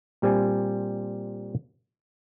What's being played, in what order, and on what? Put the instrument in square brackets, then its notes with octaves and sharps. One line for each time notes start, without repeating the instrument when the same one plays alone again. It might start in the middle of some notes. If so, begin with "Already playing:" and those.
[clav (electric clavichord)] A#2 G3 C4 G#5